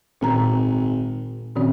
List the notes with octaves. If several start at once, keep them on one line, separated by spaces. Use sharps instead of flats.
G#1 A#2 A#5
F#2 A#2 D#3 C4